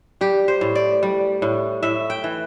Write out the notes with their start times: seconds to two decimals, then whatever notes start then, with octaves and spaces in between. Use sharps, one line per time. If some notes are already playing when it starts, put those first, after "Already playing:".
0.21 G3 G4
0.48 C5
0.61 A2
0.75 D5
1.03 G3
1.42 A2
1.83 A2 E5
2.10 G5
2.24 E3